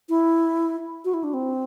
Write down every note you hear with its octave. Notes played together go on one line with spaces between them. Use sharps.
E4
F#4
E4
D4
C4